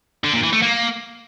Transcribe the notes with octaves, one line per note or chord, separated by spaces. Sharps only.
D3
A#2
E3
A3
A#3